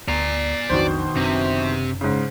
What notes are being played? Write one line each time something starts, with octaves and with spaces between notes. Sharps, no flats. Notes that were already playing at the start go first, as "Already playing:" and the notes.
D2 D5 A#5
B1 F2 B2 D#3 D4 C5
F#1 C3 D4
G#2 C#3